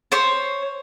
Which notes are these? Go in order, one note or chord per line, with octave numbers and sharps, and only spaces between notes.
C5 C#5